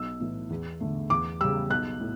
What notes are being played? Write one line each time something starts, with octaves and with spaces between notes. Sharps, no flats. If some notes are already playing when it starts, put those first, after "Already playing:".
Already playing: B1 E6
A2 E3
E2
D3 A3
E2 D6
C#3 G3 E6
B1 F#6
A2